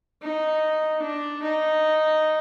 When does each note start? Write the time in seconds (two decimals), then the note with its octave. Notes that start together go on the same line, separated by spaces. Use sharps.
0.22 D#4
1.02 D4
1.43 D#4